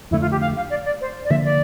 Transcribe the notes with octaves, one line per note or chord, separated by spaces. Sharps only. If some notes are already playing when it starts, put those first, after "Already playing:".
F2 D3 A3 E4
F4
G4
F5
F5
D5
D5
C5
D5
D3 F3 A#3 E5
D5